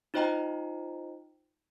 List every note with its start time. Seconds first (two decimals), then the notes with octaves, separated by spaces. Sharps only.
0.14 D#4 F4 C5 D#5 G5 A#5